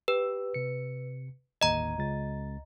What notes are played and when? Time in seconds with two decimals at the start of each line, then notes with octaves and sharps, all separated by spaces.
0.08 G4 B4
0.54 C3 C#7
1.61 G1 D#2 A2 D#5 A#5
1.98 C#2 A6